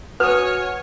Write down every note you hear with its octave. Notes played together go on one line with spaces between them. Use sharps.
F#4 B4 C#5 G#5 D#6 F6